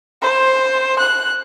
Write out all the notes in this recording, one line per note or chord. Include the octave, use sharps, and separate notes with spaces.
C5
F#6